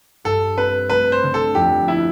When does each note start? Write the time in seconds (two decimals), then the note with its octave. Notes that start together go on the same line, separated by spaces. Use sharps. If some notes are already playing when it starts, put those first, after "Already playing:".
0.24 G2 A4
0.57 C4 B4
0.90 A3 B4
1.12 C5
1.23 D3
1.34 A4
1.55 F2 G4
1.87 B3 E4